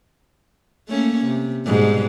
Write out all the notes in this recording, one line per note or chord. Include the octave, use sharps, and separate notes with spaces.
A3 A#3 C#4
C3
G#2 B2 G3